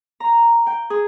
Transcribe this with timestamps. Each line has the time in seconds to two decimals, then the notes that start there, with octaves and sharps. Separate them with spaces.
0.20 A#5
0.67 G5
0.90 G#4